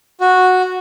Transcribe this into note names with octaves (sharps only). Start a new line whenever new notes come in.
F#4